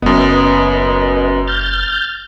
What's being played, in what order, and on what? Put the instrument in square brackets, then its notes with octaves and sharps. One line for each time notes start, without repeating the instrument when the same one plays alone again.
[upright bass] F#1 [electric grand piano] F#2 B3 [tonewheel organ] B4 D#5
[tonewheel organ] F6 G6 A6